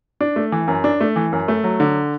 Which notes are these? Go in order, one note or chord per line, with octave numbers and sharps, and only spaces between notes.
D4
A3
E3
F#2
D4
A3
E3
F#2
A3
F#3
D3